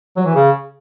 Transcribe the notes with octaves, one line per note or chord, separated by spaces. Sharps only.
F#3
E3
C#3